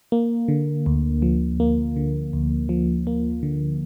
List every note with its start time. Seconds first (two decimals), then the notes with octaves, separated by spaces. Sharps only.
0.12 A#3
0.48 D3
0.86 D2
1.22 F3
1.60 A#3
1.96 D3
2.33 D2
2.69 F3
3.07 A#3
3.43 D3